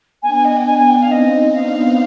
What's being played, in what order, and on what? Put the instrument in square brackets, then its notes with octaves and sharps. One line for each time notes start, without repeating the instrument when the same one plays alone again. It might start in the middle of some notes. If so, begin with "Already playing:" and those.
[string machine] B3 D4 [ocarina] G#5
[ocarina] G#5
D#5
G5
G#5
G#5
G5
F5
[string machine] C4 D#4 [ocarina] D#5
[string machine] B3 D4 [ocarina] F5